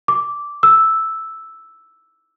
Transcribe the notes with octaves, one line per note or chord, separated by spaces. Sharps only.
D6
E6